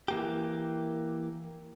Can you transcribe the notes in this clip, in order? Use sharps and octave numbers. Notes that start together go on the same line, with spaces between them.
E3 A#3 G4